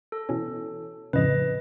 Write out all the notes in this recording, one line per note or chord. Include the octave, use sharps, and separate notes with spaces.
A4
B2 E3 C#4
F2 A2 C#3 B4 D#5